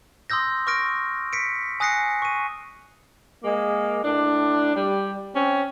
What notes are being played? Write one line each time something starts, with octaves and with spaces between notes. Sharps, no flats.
C6 D#6 E6 G6 A#6
C#6 D#6 F6 A#6 D7
B6 C#7 D7
G#5 D#6 F#6 A#6 C7 C#7
C#6 D#7
G#3 A#3
A2 D4
G3
C4 C#4